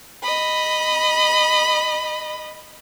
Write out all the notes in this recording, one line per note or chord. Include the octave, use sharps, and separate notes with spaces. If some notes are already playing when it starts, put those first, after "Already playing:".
D#5 B5